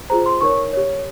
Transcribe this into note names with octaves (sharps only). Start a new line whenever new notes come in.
F4 G#4 C5 A#5
C6
D#4 A#4 C#5 C#6
G4 C#5